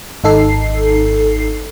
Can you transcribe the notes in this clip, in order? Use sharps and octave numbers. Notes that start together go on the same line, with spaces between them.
G#1 D#4 A4 C7